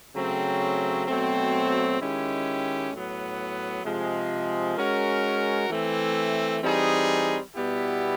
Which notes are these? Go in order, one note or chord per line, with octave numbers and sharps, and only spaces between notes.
C#3 F#3 A3 C4
B2 F#3 A3 C4
D#3 G#3 C#4 E4 G4
A2 F#3 B3
C3 F3 G#3
G#3 C#4 F#4 A#4
E3 A3 C4
E3 G3 C4 D#4 G#4
B2 G3 B3 E4 G4